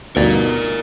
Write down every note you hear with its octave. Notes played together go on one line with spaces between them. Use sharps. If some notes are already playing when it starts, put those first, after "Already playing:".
D2 G2 B2 D#4 A#4 D5